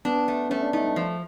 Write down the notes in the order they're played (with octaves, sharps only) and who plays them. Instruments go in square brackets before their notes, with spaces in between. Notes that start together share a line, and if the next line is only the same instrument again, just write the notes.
[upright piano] B3 [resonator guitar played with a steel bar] D4
[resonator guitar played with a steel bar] A3
[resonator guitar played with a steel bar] A3 [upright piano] C#4
[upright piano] D4
[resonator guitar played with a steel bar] A3 [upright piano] D#4
[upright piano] D4
[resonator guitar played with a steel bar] F3